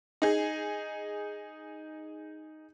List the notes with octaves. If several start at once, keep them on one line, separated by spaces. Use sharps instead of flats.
D#4 G#4